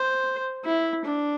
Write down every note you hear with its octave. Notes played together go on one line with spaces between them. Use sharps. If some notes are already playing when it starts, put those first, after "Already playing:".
Already playing: C5
E4
D4